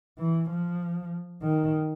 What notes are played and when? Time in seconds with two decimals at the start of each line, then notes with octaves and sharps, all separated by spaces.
0.19 E3
0.50 F3
1.42 D#3